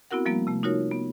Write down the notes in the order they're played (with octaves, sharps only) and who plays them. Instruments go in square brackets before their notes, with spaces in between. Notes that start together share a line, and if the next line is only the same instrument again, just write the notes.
[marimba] B3 C4 E4 F#4 A#4 F#5
F3 G3 A#3 B3
C3 A3
D#4 F4 F#4 A#4 C#5
B3